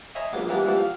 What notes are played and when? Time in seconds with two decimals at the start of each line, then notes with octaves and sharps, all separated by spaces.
0.15 C#5 D#5 E5 G#5 A#5 C6
0.33 A#1 F#2 A#3 B3 D6
0.49 E3 G3 A#3 B3 D4
0.65 G2 E3 F3 A3 B3
0.79 F5